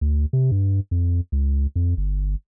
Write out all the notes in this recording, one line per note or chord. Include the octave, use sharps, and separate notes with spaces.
D2
C3
G2
F2
C#2
F2
G1